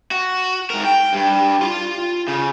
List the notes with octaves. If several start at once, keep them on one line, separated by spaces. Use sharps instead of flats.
F#4
G#2 A#4
G5
G2
F4 C6
C#3